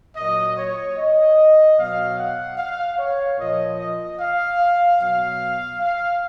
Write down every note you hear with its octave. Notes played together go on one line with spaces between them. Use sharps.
A#2 F#3 D#5
C#5
D#5
B2 F#3 F5
F#5
F5
C#5
A#2 F3 D#5
D#5
F5
B2 F#3 F5
F5